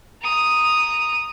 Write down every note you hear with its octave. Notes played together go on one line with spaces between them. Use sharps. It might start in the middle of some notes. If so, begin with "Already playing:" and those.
A#5 D#6